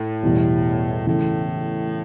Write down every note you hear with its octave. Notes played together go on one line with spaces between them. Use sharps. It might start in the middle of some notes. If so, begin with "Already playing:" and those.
Already playing: A2
E2 B2 G3
A2 C#3 E3 A3